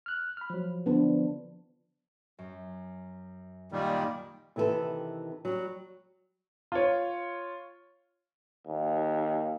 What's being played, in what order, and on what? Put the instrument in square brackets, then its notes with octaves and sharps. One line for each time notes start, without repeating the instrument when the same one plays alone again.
[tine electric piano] F6 F#6
B5 F6
F3 F#3
[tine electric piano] D3 F3 [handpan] B3 D4
[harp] F#2
[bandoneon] A#2 D#3 G3
[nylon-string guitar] C3 D#3 E3 F#4 A4 B4
F#3 G3
[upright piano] F4 C#5
[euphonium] D#2